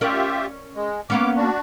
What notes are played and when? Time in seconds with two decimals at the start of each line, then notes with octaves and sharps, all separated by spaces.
0.01 C#4 F4 G4 A#4 D5 E5
0.75 G#3
1.10 A#3 B3 C#4 D6
1.37 D4 F#4